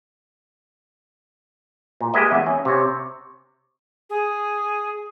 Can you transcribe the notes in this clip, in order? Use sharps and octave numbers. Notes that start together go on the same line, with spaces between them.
A#2
G#3 A#3 G4 B4 D#5 E5
E2 E5
C#4
C3 C#5
G#4